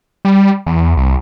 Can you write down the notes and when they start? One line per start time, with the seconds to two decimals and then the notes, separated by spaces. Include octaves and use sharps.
0.25 G3
0.66 E2
0.97 C2